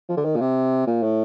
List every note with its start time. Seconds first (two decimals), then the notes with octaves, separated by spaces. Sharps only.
0.09 F3
0.17 D3
0.25 D#3
0.36 A#2
0.41 C3
0.87 A#2
1.03 A2